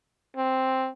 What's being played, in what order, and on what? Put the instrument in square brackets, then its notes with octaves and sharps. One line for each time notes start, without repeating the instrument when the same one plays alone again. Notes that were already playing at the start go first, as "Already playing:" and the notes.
[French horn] C4